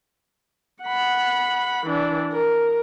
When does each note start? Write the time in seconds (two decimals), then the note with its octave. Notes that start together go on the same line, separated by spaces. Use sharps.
0.83 F#5 B5
1.86 E3 D4
2.32 A#4